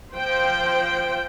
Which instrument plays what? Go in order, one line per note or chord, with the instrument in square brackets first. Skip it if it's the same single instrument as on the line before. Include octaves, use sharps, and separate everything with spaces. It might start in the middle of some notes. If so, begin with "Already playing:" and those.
[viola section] F3 C5 G5